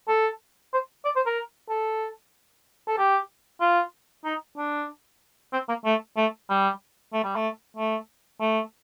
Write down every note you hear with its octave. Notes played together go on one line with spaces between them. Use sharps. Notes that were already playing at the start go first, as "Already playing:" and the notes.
A4
C5
D5
C5
A#4
A4
A4
G4
F4
D#4
D4
C4
A#3
A3
A3
G3
A3
G3
A3
A3
A3